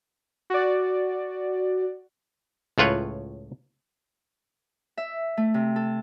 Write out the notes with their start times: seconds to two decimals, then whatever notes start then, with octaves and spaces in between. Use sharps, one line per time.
0.50 F#4 D5
2.78 C#2 A2 F4 B4 C#5
4.97 E5
5.37 A3
5.54 C3
5.76 A4